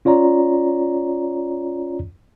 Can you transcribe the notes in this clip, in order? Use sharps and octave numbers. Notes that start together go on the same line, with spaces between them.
C#4 F4 C#5 D5 A#5